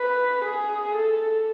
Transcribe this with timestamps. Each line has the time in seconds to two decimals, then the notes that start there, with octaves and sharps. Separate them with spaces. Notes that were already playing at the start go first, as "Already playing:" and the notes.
Already playing: B4
0.45 G#4
0.96 A4